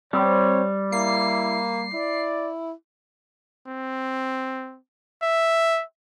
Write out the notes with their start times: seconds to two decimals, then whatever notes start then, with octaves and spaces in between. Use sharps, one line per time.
0.13 G3 C4 C#5
0.92 A#3 E4 C7
1.93 E4 D5
3.67 C4
5.22 E5